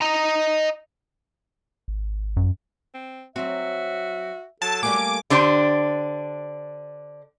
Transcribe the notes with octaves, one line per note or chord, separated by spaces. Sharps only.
D#5 A#5
G#1
F#2
C4
F#3 C4 F#4 E5
F#3 A4 A5
G3 A3 A#3 G#5 D6
D3 D4 G4 C5